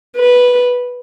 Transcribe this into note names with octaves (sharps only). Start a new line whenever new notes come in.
B4